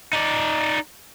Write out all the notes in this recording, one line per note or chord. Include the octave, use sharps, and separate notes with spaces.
D#4 D5